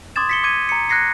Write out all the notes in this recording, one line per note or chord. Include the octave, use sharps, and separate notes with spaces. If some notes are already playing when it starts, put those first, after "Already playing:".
C6 D6 D#6 G#6 A6 E7
B6 C#7 G7
D6 G#6 D#7
A#5 C#7
F#6 G#6 A#6 C7 C#7